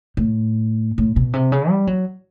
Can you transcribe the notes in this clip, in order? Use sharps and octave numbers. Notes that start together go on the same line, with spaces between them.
A2
A2
B2
C3
C#3
G3
F#3